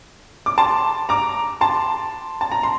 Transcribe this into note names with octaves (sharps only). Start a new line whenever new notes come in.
D6
A5 C6
A#5 D6
A5 C6
A5
A#5
C6